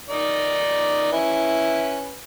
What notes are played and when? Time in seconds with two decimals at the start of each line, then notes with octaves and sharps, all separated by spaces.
0.09 D#3 D#4 D5
1.12 C#4 E4 B4